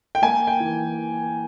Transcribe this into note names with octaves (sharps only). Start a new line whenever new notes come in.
G5
A#3 G#5
G5
E3